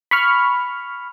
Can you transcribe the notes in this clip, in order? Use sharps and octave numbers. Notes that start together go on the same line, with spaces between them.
B5 C#6 F6